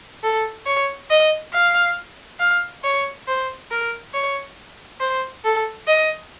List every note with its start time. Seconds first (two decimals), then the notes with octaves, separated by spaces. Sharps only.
0.23 A4
0.66 C#5
1.10 D#5
1.53 F5
2.40 F5
2.84 C#5
3.27 C5
3.70 A#4
4.14 C#5
5.00 C5
5.44 A4
5.88 D#5